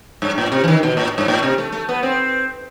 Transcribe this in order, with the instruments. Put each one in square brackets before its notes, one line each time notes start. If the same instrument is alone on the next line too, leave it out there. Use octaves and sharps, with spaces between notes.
[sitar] G2
A2
C3
E3
D#3
B2
A2
G2
A2
C3
A3
A3
B3
C4